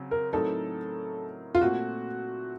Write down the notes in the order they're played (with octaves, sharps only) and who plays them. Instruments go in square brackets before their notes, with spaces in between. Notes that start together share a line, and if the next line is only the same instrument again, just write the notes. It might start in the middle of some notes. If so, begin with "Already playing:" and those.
Already playing: [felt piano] C#3 F#3 C4
[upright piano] A#4
[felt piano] A2 F#3 C4 D#4 A#4 [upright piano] A4
[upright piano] F4
[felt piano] A#2 A3 C4 [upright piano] F#4